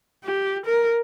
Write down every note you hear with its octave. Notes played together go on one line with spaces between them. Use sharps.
G4
A#4